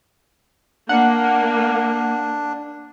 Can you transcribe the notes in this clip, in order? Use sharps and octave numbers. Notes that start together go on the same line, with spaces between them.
A#3 D4 F#5